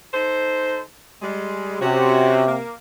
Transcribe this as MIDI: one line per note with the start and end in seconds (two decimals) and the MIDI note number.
0.13 0.80 63
0.13 0.80 69
0.13 0.80 72
1.22 1.79 55
1.22 1.79 56
1.81 2.58 48
1.81 2.43 61
1.81 2.43 66
2.47 2.74 58